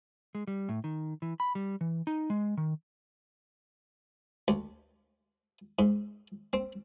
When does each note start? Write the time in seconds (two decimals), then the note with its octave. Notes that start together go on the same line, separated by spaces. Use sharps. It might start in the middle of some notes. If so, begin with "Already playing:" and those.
0.35 G#3
0.47 G3
0.69 A2
0.84 D#3
1.22 E3
1.40 B5
1.55 G3
1.81 E3
2.07 D#4
2.30 G#3
2.57 D#3
4.48 D2
5.79 G#2
6.53 C4